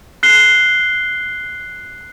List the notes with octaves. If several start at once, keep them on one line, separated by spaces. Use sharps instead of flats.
F#6 C7 G7